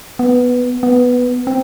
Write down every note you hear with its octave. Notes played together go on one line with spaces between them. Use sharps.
B3
B3
C4